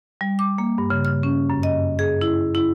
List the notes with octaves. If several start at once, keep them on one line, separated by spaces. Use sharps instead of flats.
G3
D6
A#3
G2
C#3
F6
C#4
F#2
D#5
G#4
E4
E4